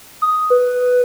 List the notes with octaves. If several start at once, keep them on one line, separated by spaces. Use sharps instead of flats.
D#6
B4